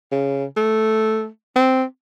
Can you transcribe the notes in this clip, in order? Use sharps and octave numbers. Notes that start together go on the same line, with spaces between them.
C#3
A3
C4